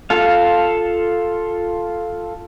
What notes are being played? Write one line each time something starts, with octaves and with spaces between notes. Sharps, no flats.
F4 A4 F5